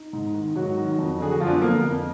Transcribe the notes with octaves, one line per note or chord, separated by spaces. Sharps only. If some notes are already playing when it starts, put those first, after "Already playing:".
Already playing: D#4
G#2
D#3
G#2 F#3 F#4
D#3
F2
D3 G#4
F#4
F#2 F3 F4
D4
B3
D3 A#3 A#4
F2